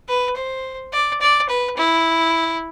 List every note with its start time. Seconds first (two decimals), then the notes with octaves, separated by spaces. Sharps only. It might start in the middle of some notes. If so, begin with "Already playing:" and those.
0.08 B4
0.36 C5
0.93 D5
1.21 D5
1.49 B4
1.77 E4